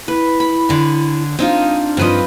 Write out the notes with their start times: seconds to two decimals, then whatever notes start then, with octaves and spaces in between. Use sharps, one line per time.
0.08 E4 B4
0.40 B5
0.69 D3 C#4
1.39 G#3 C4 D4 D#4 F4
1.97 G2 F3 C4 B4 D#5